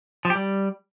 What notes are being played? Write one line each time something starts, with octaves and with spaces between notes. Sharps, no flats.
F3
G4
G3